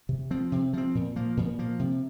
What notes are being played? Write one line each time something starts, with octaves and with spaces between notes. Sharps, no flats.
C3
F3 C4
C3
F3 C4
A#2
F3 A#3
A#2
F3 A#3
C3